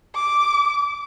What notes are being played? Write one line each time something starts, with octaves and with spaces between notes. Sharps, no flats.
D6